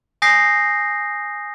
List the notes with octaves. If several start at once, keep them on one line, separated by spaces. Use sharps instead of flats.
G#5 D#6 G6 A#6 C7